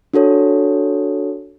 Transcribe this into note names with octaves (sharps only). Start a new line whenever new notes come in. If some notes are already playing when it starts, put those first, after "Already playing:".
D4 F#4 A4 C#5